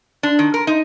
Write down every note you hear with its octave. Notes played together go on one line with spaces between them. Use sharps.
D4
D#3
A#4
D#4